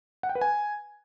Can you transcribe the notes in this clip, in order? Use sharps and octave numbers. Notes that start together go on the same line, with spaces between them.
F#5
G5
B4
G#5